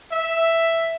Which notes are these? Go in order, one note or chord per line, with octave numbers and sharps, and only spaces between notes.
E5